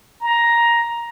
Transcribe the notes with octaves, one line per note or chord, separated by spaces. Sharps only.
A#5